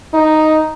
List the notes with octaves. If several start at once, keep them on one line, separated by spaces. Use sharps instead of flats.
D#4